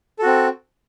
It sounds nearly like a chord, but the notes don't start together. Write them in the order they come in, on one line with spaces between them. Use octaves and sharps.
A4 F#4 C4